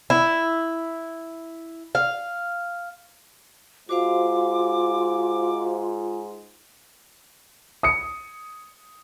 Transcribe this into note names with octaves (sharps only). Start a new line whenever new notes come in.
E4
F5
G#2 F4 F#4 C5 F5 D6
D#6 C#7